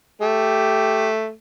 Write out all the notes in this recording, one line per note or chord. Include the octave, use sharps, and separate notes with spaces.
A3 G4